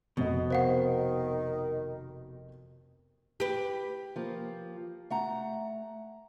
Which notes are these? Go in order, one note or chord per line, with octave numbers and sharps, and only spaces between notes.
F1 F2 B2 D#5
D#3 C5 F5 F#5
G4 B4
F3 A#3
A3 F#5 A#5